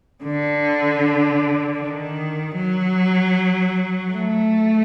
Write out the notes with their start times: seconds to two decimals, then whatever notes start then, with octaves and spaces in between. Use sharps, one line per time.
0.24 D3
1.78 D#3
2.56 F#3
4.12 A3